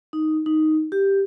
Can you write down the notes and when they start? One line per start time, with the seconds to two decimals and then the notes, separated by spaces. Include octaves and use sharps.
0.13 D#4
0.46 D#4
0.92 G4